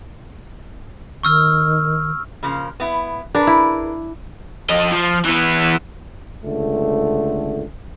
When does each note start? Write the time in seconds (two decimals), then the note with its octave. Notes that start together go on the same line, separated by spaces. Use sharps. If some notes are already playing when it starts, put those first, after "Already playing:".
1.23 D#3 C#6 E6 F6
2.43 C#3 F3 A#3
2.80 B3 E4
3.35 D4 G#4 A#4 B4
3.47 E4
4.70 F2 D#5
4.92 F3
5.25 E3 B3
6.43 C#2 D3 A3